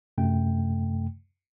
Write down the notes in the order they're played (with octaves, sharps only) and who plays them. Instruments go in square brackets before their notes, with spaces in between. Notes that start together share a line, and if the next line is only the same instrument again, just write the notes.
[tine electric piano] F#2 C3 A3 G5